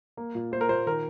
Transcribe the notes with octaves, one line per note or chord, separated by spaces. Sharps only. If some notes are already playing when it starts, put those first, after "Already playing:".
A#3
A#2
A#3 C5
A#4
A#2 C5
D#3 A#4